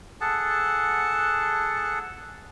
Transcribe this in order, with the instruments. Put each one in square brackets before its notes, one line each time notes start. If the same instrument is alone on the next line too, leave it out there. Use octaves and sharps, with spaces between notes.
[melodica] G#4 A4 F#5 A5